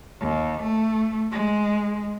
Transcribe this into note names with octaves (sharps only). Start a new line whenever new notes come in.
D#2
A3
G#3